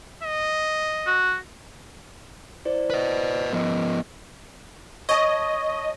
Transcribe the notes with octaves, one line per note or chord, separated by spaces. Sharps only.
D#5
F#4
E4 C5 D5
B4 D#5
F3 B3 A#4 D#5
C#5 D#5 A5